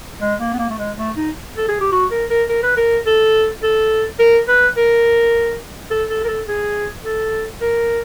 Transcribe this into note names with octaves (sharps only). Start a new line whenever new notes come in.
G#3
A#3
B3
A#3
A3
G#3
A3
D#4
A4
G#4
G4
F#4
A#4
A#4
A#4
B4
A#4
A4
A4
A#4
B4
A#4
A4
A4
A#4
A4
G#4
A4
A#4